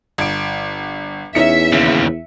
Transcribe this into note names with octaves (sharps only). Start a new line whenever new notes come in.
G1 D7
E2 C#4 D#4 E5 C#7
D#2 C#3